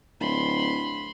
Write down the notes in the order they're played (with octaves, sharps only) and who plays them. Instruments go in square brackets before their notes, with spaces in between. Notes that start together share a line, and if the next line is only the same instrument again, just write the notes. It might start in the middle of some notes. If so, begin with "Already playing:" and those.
[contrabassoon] D1 [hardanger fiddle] B5 C6